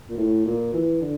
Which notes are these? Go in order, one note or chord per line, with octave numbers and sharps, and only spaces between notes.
A#2
A2
A#2
E3
D3